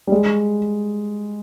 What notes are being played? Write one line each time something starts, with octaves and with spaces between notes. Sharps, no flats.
G3
G#3